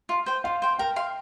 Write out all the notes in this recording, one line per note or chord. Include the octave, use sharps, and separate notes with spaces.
F4
C5 G5
F4 F5
C5 G5
A#4 G5
F5 C6